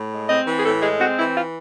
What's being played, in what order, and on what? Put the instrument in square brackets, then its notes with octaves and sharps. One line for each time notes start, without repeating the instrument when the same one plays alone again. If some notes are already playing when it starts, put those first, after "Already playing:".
Already playing: [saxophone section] A2
G#3
C4 D#5
E3
G#4
A2 A4
G#3 G#4
C4 F#4
E3 E4
F4